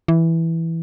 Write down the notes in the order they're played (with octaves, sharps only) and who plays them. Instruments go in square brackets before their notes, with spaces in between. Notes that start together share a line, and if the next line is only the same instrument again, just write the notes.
[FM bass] E3